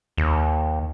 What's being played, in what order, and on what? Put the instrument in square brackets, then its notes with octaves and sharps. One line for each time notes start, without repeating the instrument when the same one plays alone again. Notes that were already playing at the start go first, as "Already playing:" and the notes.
[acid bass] D#2